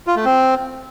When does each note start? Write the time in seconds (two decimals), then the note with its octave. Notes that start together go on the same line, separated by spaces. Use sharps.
0.07 F4
0.16 A3
0.25 C4